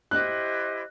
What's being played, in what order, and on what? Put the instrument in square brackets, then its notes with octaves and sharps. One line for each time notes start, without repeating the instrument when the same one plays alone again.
[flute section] E4 G4 C5 D#5 [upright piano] F#6